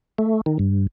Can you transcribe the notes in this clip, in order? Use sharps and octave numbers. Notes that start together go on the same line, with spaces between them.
A3
D#3
G2